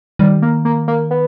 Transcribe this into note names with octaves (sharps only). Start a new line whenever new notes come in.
D#3 G3
A#3
A#3
A#3
B3